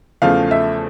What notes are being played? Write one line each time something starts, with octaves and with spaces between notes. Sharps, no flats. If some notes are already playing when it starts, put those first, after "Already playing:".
E2 C#3 F3 A3 F5
E5